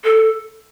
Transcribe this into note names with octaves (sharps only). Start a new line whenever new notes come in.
A4